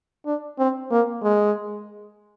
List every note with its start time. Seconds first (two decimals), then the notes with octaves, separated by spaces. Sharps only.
0.26 D4
0.59 C4
0.91 A#3
1.23 G#3